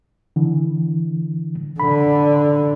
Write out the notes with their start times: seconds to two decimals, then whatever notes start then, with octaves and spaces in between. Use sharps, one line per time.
0.36 D3 E3
1.80 D3 B5